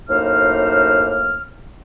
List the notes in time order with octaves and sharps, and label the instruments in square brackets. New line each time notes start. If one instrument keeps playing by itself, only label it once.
[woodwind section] F#2 A2 A#3 D#4 C5 F6